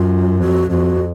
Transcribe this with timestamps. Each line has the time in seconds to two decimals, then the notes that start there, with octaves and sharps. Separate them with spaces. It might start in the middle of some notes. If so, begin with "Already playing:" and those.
Already playing: F#2 F4
0.40 F2 F#4
0.70 F2 F#4